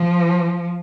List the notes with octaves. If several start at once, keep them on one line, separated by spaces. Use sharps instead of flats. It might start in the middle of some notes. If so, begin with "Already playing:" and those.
Already playing: F3